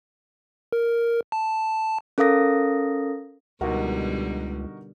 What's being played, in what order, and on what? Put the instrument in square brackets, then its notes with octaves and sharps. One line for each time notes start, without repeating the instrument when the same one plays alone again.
[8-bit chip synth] A#4
A5
[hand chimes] C#4 A4 A#4 F5 D#6 A#6
[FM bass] C#2 [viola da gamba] B2 D3 G3 [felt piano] D#4 F#4 A#4